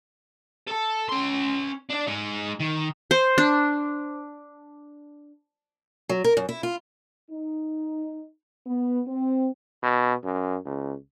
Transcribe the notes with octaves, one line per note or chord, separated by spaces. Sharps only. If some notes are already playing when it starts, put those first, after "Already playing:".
A4 A5
C#4 C6
D4 D5
G#3 D#4
D#3
C5
D4
F#3
A#4
F#2
E4
F4
D#4
B3
C4
B2
F#2
C#2